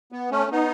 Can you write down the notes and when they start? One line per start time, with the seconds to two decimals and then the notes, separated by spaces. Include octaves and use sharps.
0.12 B3
0.31 A3 C#4
0.52 B3 D#4